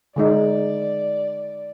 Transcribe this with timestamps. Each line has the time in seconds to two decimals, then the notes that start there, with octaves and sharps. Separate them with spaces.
0.16 D3 G#3 D#4 D5